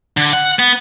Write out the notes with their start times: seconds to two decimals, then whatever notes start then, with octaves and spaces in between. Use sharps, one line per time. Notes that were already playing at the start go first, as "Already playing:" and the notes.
0.17 D3
0.33 F#5
0.59 B3